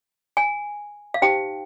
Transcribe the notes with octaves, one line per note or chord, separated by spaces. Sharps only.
G#5
F5
D#4 G4 C5 G5